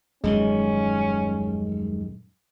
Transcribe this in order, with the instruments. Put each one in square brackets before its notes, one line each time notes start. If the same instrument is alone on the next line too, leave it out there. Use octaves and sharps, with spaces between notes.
[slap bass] D#1 F#2 D#3 [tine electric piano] G#3 [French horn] C#4